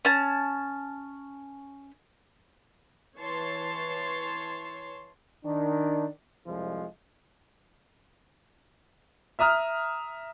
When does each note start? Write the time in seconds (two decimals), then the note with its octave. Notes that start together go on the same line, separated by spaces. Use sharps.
0.05 C#4 A5
3.18 E3 C#5 A5 C6
5.44 D#3 D4
6.46 C2 F2 F3 F#3 G#3
9.39 E5 A#5 D#6 F6